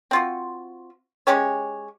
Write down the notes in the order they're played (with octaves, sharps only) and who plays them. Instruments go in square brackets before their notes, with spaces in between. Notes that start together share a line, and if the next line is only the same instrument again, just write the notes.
[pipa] C4 F4 F#4
G#3 C#4 G4 C#5